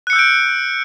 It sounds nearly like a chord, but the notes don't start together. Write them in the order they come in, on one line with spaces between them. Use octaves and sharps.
F#6 C#7 E6 G6 D7